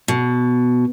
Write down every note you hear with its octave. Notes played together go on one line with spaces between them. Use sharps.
B2